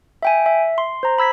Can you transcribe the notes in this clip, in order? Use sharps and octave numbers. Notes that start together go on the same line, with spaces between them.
E5 G5 G#5
E5
C6
C5 A#5
B5 E6 G#6 B6